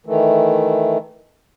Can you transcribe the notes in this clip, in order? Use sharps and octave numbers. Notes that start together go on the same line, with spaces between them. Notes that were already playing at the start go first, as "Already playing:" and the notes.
D#3 E3 A3